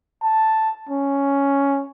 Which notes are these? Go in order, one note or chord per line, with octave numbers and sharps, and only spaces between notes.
A5
C#4